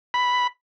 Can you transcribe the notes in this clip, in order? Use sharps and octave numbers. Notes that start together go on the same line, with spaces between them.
B5